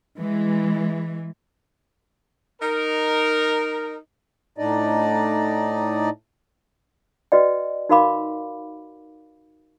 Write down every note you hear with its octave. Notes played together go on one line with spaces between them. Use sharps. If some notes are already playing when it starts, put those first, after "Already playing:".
E3 G#3
D#4 A#4
A2 D4 D#4 D5 D#5
F#4 B4 D5 D#5 G5
D#4 F#4 A#4 F5 B5 D6